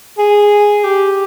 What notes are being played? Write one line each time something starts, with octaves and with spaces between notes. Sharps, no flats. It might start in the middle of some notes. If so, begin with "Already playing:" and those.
G#4
G4